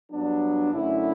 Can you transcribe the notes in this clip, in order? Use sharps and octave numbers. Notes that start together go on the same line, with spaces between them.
G2 F#3 B3 D4
F#2 D3 A3 C#4 E4